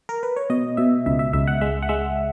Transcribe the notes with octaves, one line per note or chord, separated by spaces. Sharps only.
A#4
B4
C#5
B2 D#5
B2 E5
C#2 E5
E5
C#2 E5
F#5
G#3 E5
F#5
G#3 E5